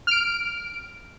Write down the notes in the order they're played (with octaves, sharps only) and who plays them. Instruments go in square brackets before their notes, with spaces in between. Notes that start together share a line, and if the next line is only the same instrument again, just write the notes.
[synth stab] F6 D7